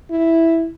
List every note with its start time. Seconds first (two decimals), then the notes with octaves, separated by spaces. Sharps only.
0.10 E4